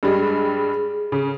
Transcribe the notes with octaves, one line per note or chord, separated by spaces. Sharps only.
G2 G3 G#3 G#4
C#3